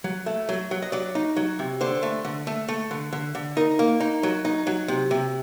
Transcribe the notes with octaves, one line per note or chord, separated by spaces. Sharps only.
F#3
A3
F#3
F#3
D#5
F#3 D5
D#4
F#3
C3
D3 C5
A3
D3
A3
A3
D3
D3
D3
D#4 A#4
A#3
D#4
F#3
D#4
F#3
C3
C3